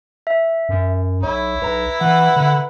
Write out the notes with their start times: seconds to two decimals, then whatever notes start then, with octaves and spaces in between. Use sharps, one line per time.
0.27 E5
0.69 F#2
1.23 B1 E4 C#5
1.62 B1 B4 A#5
2.01 E3 F#5
2.36 D3